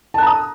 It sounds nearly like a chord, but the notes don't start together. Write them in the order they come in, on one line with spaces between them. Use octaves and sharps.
A5 F#6 A#5 D#6